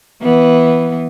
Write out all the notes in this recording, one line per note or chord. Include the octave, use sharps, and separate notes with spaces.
E3 B3